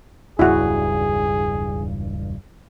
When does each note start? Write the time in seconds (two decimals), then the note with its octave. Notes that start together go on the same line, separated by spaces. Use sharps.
0.39 E1 C#2 G2 E4 F#4 G#4